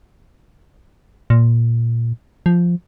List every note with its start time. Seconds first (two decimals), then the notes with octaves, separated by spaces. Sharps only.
1.30 A#2
2.46 F3